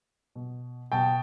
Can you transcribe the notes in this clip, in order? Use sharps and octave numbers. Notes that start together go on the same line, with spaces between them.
B2
B2 G5 A5